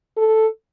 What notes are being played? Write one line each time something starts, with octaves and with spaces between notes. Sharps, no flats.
A4